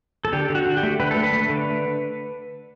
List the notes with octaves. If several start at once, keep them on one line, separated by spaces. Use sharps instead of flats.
A4
D3 G4
D3
F#4
D3
G4
A3
D3 B4
A4
A3
B4
A3
D3